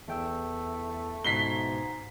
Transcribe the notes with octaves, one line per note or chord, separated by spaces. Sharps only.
E2 A3 G5 E6
C#2 G#2 B2 B6 C7 G7